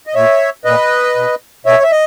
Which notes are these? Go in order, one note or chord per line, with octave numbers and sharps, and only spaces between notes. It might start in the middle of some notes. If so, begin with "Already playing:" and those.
D#5
A#2 C#5 E5
A#2 B4 D#5
B2
B2 C#5 E5
E5
D#5